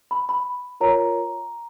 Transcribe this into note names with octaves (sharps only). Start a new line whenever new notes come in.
B5
B5
F4 A#4 C#5 A#5